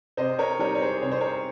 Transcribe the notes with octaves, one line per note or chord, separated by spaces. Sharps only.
C3 C5 D#5
A#4 C#5
G3 C4 D#4 A#4 C#5
C#5
G#4 C5
C3 C#5
C5
A#4 C#5